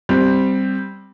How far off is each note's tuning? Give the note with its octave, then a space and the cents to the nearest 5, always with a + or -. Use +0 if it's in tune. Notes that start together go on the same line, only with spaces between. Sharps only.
G3 +0 C4 +0